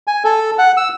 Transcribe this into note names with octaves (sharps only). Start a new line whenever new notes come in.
G#5
A4
F#5
E6